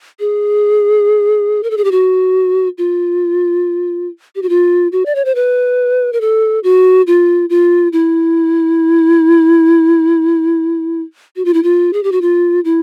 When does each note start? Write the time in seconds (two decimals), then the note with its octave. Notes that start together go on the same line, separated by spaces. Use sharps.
0.20 G#4
1.63 A#4
1.70 A4
1.77 G#4
1.84 G4
1.91 F#4
2.78 F4
4.35 G4
4.42 F#4
4.49 F4
4.92 F#4
5.06 D5
5.15 C#5
5.25 C5
5.35 B4
6.13 A#4
6.21 A4
6.64 F#4
7.07 F4
7.50 F4
7.93 E4
11.36 F#4
11.45 F4
11.54 E4
11.63 F4
11.93 G#4
12.03 G4
12.12 F#4
12.21 F4
12.65 E4